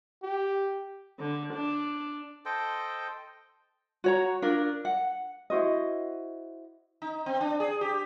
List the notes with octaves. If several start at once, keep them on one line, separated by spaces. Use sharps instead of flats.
G4
D3
D4
A4 C5 D#5 G5
F#4 C#5 A#5
D4 F4 A#4
F#5
E4 F#4 C5 D#5
D#4
C4
D4
G#4
G4